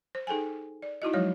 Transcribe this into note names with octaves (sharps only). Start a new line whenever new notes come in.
C5
D#4 G#4 A4 G5 G#5
D5
D#4 E4 F#4 D#5
F3 F#3 G#3 C#5